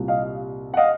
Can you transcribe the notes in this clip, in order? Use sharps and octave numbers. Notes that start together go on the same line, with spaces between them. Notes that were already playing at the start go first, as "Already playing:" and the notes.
Already playing: C2 A#2 G3
D#5 F5
F#5
D#5 F5